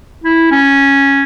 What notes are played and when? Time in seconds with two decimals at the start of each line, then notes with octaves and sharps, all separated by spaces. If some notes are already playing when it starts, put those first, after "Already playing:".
0.24 E4
0.51 C#4